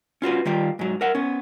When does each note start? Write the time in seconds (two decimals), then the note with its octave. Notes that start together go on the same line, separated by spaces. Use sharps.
0.22 C#4 F4 F#4 B4
0.45 D#3 G3 F4 G4
0.79 G#2 F#3
1.01 A#4 E5 F#5
1.15 B3 C#4